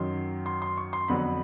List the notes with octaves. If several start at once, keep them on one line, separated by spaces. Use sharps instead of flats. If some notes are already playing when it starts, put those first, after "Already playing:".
Already playing: F#2 D#3 F#3 C6
C6
C6
C#6
C6
F2 D3 F#3 B3 B5